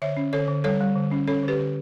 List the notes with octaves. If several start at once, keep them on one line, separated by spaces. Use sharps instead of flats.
D3 C#5 E5
C#4
D3 A4 C#5
D3
G3 A4 C#5
G3
D3
C#4
C#4 A4 C#5
D3 G4 B4
D3